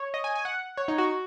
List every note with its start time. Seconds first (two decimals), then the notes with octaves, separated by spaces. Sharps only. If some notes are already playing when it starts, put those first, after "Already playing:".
Already playing: C#5
0.14 D#5
0.24 G#5
0.35 G#5
0.45 F#5
0.77 C#5
0.88 D#4
0.98 F#4